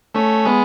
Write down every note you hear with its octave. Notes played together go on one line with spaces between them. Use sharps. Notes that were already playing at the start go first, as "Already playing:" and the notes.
A3 C#4
G#3 B3